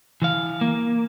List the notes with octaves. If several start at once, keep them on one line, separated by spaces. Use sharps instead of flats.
E3 F5
A#3